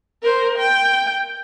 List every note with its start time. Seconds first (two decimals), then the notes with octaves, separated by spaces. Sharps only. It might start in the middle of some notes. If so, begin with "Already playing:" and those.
0.22 A#4 C5
0.58 G5